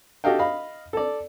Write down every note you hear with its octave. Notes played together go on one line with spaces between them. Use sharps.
F#4 G4 A4 D#5 F5 G5
D#5 F5 B5
A4 D5